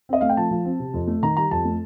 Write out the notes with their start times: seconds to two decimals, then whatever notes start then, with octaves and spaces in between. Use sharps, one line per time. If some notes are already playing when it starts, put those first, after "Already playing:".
0.09 C4 D#5
0.21 A3 F5
0.29 G5
0.37 F3 A5
0.51 F3
0.65 C4
0.79 C3
0.94 F2
1.07 A3
1.23 D#3 A#5
1.37 G3 A#5
1.51 F2 A5
1.65 A3